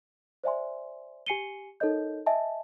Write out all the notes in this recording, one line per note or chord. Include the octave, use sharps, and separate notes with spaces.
C5 D5 E5 G#5 C6
G4 G#5 C7 C#7 D#7 G7
D#4 A4 A#4 C#5 D#5 G6
D#5 E5 G#5 A5